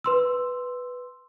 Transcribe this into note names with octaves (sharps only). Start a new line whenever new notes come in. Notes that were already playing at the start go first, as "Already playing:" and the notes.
B4 C6 E6